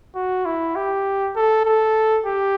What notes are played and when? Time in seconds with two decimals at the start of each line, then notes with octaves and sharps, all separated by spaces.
0.15 F#4
0.45 E4
0.76 G4
1.36 A4
1.65 A4
2.26 G4